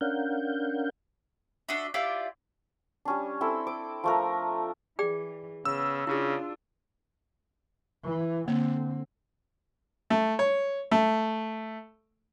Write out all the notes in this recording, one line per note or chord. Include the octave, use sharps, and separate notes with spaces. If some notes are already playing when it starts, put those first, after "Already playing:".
C#4 D4 A#4 F5 F#5 G6
D4 F#4 D#5 E5
E4 F4 G4 D5
G3 C#4 D4
C4 E4 A4 E6
D6
F3 A3 A#4
E3 G#4 D5 G5
C#3 B3 E6
C#3 D4 E4 F4 G#4
E3
D3 A#3 C4
A3
C#5
A3